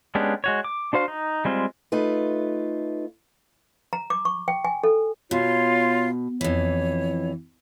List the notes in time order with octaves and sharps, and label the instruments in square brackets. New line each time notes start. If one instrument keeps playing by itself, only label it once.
[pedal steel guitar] G#3 B3 C#4 D4 G4
G#3 F#4 C#5
D6
D4 F#4 C5 F5
D#4
G3 G#3 C4 F4
[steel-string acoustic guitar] A3 D#4 F4 B4
[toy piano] A#5
D6
C#6
G5
G#5
A4
[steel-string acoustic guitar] B2 [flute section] F4 C#5 C6
[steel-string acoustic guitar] F2 E3 [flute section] C#5